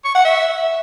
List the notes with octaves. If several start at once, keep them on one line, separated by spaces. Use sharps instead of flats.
C#6
F#5
E5